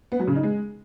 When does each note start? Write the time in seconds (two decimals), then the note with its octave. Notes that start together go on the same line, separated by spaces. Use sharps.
0.12 B3
0.20 F#3
0.28 C#3
0.35 D#4
0.43 G#3